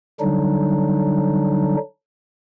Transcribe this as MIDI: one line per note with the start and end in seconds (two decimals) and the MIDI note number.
0.20 1.76 50
0.20 1.76 54
0.20 1.76 55
0.20 1.76 62
0.20 1.76 63